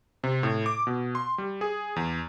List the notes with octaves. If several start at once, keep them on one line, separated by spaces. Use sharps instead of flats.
C3
A2
D6
B2
C6
G3
G#4
E2